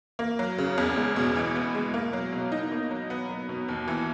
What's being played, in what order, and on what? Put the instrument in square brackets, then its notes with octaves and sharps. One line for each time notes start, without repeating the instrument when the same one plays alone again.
[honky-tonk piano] A#3
F#3
C#3
E2
G#3
B2
E3
B3
G#3
A#3
F#3
B2
D#4
A#3
F#3
B3
F#3
B2
D#2
E3